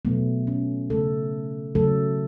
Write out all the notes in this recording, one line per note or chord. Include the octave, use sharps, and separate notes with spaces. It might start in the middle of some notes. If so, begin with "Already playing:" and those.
B2 F#3 A3 B3
C#4
C#3 A3 A4
C#3 F#3 A3 A4